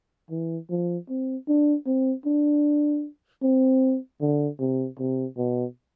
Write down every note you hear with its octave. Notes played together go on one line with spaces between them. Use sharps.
E3
F3
C4
D4
C4
D4
C4
D3
C3
C3
B2